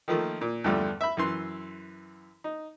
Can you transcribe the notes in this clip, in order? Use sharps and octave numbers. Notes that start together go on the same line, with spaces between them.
D#3 F3 A3 A#3
A#2
E2 G2 D3 F3 G3 A3
E5 B5
F#2 E3 C6
D#4